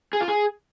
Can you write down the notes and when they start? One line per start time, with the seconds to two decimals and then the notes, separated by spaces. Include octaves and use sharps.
0.13 G#4
0.21 F4
0.28 G#4